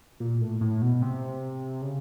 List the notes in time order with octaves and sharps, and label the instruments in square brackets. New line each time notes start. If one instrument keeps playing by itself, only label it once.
[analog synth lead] A#2
A2
A2
B2
C3
C#3